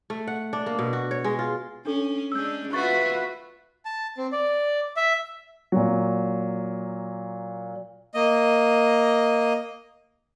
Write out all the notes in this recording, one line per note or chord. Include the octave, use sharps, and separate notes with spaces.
A3
F#5
D4
A#3
B2
F#4
C#5
G#3
F4
C#4 D4 A4
G#3 C#4 D4 E6 G6
F4 F#4 B4 E5 C#6 A6
A5
C4
D5
E5
A#2 F#3
A#3 D#5